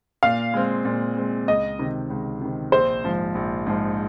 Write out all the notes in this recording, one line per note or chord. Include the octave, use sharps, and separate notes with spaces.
A#2 F5
G#3 C4
A#2
G#3 C4
C#2 D#5
C3 D#3
C#2
C3 D#3
A#1 C5
G#2 F3
A#1
G#2 F3